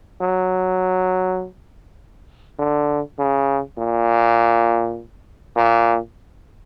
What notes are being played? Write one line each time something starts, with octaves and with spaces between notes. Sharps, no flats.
F#3
D3
C#3
A#2
A#2